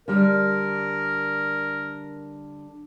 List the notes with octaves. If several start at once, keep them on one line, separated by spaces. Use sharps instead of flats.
D3 G3 A#4